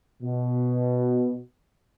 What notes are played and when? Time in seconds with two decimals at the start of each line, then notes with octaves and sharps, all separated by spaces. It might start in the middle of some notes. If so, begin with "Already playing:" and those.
0.23 B2